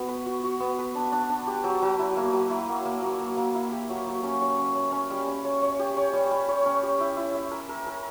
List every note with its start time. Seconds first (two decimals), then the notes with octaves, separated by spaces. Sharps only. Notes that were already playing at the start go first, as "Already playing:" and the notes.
Already playing: B3 F#4
0.08 B4
0.26 F#4
0.44 F#4
0.60 B3
0.79 B4
0.95 D4
1.12 D4
1.30 D4
1.47 G4
1.64 F#3
1.82 F#3
1.99 E4
2.17 A#3
2.33 F#3
2.50 E4
2.69 A#3
2.85 A#3
3.02 F#3
3.20 A#3
3.37 A#3
3.55 E4
3.72 G4
3.90 F#3
4.07 F#3
4.23 C#4
4.41 C#5
4.58 C#4
4.75 C#4
4.92 C#4
5.10 G3
5.27 C#4
5.45 C#5
5.62 C#5
5.79 G4
5.97 C#5
6.13 G3
6.31 G3
6.49 C#5
6.65 C#4
6.83 G4
7.00 E4
7.17 E4
7.35 E5
7.51 A#4
7.69 A#4
7.87 A#4